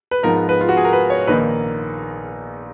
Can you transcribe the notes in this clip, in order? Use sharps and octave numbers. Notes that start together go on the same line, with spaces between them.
B4
G#2 F3 B3 D#4 A#4
B4
F4
F#4
G#4
A#4
B4
C#5
A#1 D#3 A#3 D#4 B4